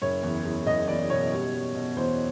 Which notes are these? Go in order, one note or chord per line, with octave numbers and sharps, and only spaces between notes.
F#1 C#5
E2
E2
F#1 D#5
E2 D5
B2 C#5
G3
G3
B2
E2 C5